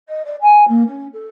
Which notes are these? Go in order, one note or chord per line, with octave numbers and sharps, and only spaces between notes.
D#5
D5
G#5
A#3
C#4
A4